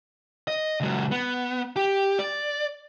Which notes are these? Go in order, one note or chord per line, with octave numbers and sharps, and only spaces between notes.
D#5
C#2 F#3
B3
G4
D5